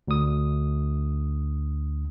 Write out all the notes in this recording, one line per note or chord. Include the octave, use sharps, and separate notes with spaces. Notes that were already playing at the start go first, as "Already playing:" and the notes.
D2 D#6